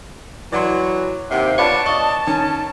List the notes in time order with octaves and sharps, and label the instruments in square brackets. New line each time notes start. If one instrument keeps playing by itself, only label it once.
[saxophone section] E3 F#3 [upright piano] D5 C6
[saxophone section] D#2 C3 [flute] F#5
[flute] F5
[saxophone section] B3 D4 C#5 [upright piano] F4 B4 D5 [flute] A5
[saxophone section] D5 D#5 [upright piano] C#6
[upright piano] D#3 [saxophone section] C#4